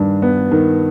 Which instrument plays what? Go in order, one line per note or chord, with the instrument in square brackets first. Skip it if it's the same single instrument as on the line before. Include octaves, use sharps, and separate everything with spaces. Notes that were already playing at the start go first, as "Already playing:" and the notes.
Already playing: [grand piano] G2 D#3 D4
B3
D#3